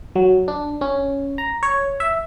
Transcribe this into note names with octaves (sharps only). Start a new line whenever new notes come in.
F#3
D4
C#4
A#5
C#5
E5